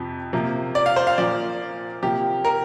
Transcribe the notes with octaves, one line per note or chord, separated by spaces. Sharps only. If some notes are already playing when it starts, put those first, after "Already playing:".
Already playing: F2 C3 F3
C3 F3 A#3
D5
F5
C5
F5
A#2 F3 A#3 D5
C3 F3 A#3 G4
A#4